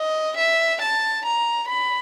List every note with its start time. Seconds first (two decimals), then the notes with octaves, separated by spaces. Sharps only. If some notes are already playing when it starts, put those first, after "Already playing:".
Already playing: D#5
0.38 E5
0.82 A5
1.26 A#5
1.70 B5